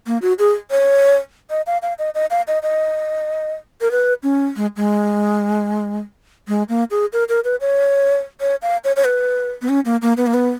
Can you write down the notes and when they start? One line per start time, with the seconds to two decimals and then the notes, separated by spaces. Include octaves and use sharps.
0.07 A#3
0.22 F#4
0.39 G#4
0.71 C#5
1.50 D#5
1.67 F5
1.82 F5
1.99 D#5
2.15 D#5
2.30 F5
2.47 D#5
2.63 D#5
3.81 A#4
3.91 B4
4.23 C#4
4.56 G#3
4.76 G#3
6.48 G#3
6.69 A#3
6.91 G#4
7.13 A#4
7.29 A#4
7.44 B4
7.61 C#5
8.41 C#5
8.62 F5
8.84 C#5
8.96 C#5
9.04 B4
9.62 B3
9.69 C#4
9.85 A#3
10.02 A#3
10.17 B3
10.27 A#3
10.34 B3